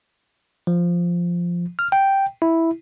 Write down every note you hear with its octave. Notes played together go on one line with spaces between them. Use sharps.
F3
F6
G5
E4